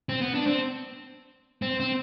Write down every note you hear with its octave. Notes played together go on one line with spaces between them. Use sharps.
C4
B3
D4
C4
C4
C4